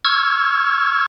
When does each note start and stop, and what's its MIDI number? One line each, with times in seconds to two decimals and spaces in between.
0.05 1.06 85
0.05 1.06 88
0.05 1.06 89
0.05 1.06 92